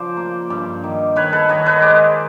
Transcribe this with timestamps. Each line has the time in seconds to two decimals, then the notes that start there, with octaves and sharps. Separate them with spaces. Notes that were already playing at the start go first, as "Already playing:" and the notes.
Already playing: C#3 F3 C5 D5
0.17 A#3
0.50 G2
0.84 D#3
1.16 D#3 B4 C#5
1.32 A4 B4
1.49 D#3 C#5 D#5
1.66 B4 C#5
1.82 G#3 C5 D5